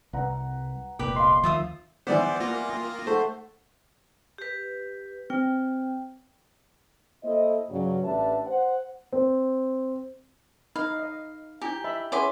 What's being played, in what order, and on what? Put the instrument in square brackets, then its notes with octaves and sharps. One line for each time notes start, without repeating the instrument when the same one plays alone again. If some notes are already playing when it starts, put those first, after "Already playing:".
[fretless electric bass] C2 [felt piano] B4 F#5 A#5
[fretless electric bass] E1 C2 A#2 [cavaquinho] G4 B4
[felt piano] D#5 F5 [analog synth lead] C6
[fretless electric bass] D2 D#3 F3 [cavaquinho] F4 E5 D#6
[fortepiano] E3 G3 B3 [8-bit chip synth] C5 D5 [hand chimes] F#5 D6
[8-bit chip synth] A#3 F4 A#6
[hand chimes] G5 C6 D#6
[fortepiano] A3 [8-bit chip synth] C5 [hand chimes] F#5 C#6
[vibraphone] G4 B4
[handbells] C4 [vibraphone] G5
[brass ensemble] A#3 E4 A4 C5 D#5
G2 C#3 F#3 G3
A1 D4 G4 B4 E5 A5
C5 F#5
[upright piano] C4
[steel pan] D#4 [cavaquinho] F5 [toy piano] B5
[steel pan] D#5
[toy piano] D4 E4 G#5 [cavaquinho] G4
[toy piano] D#5 [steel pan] E5 B5
[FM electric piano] C#4 E4 G#4 [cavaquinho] B4 C6 D6 [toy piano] F#5